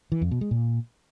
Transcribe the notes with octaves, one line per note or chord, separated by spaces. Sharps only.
E3
F2
B2
G#3
A#2